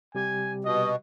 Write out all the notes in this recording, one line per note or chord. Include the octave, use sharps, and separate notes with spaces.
C3 G3 G4 G#5
B2 D#5